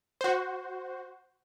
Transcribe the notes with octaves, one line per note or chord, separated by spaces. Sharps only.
F#4 C5